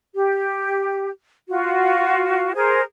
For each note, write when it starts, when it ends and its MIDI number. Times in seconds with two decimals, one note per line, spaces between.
0.15 1.10 67
1.49 2.53 65
1.49 2.53 66
2.55 2.81 68
2.55 2.81 70
2.55 2.81 72